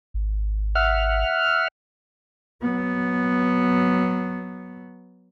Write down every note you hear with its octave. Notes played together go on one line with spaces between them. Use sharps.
G#1
E5 F#5 F6
F#3 B3